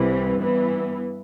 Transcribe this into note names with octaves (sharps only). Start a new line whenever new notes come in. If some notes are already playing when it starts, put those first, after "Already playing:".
Already playing: C2 C3 E3
G2 E3 B3